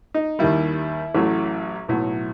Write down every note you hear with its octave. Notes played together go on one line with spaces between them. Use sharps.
D#4
D#2 D#3 G3 E4
A1 A2 F#3 A3
B1 A2 F#3